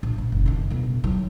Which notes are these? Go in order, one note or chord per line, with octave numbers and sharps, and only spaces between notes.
A#1
A#1
F#1
G#2 D#3
D1 B2
D#3 F#3